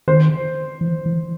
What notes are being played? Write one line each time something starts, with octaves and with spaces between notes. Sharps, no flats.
D#3 C5
E3
E3